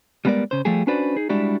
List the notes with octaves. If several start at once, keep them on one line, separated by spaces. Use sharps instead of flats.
G3 G#3 B3 G4 A#4 D5
C#3 C5
F3 G3 A3 G4 G#4
C#4 D4 F#4 B4 C5 D5
D#4 G#4
G3 G#3 D4 E4 F#4 G4